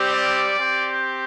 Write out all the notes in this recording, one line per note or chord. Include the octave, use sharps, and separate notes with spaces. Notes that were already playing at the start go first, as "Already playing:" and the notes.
Already playing: G3 C4 G4
D5
C4 G4